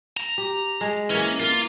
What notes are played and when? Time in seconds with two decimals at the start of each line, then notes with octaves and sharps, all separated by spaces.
0.17 A#5
0.38 G4
0.81 G#3
1.10 E3 A#3 C#4
1.40 A#3 F4